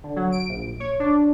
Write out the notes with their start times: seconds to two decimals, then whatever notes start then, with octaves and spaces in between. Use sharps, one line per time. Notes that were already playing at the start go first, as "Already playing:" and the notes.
0.04 D3
0.16 F#3
0.32 D7
0.49 A#1
0.80 C#5
1.00 D4